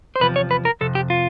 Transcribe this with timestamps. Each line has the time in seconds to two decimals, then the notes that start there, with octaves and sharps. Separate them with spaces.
0.16 C5
0.20 E2 C3 F3 B4
0.36 C#5
0.51 B4
0.65 A#4
0.81 F2 C3 A4
0.95 G4
1.10 F4